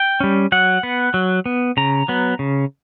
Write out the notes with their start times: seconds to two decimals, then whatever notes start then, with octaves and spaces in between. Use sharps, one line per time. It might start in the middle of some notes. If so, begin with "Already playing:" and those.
Already playing: G5
0.20 G3 C#4
0.52 F#3 F#5
0.83 B3
1.14 F#3
1.46 B3
1.77 C#3 A#5
2.08 F#3 B3
2.39 C#3